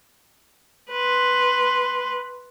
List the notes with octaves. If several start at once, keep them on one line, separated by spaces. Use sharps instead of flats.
B4 C6